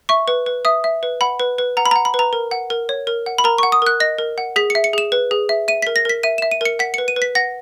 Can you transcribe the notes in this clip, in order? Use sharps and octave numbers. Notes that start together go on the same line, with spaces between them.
E5 C#6
B4
B4
E5 D#6
E5
B4
F#5 B5
B4
B4
F#5 A#5
B5
A#5
F#5
B5
B4
A#5
A#4
F#5
A#4
C#5
A#4
F#5
B5
A#4 A#5
C#6
F#5
D#6
A#4 F#6
D#5 A#6
A#4
F#5
G#4 B6
C#7
E5
C#7
G#4 E7
B4
G#4
E5
E5 D#7
B6
A#4
A#6
A#4 B6
E5 D#7
E7
E5
D#7
A#4 C#7
F#5 B6
C#7
B4
D#7
B4
B6
F#5 A#6